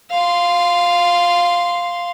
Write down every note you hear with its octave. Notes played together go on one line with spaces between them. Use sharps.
F5 C6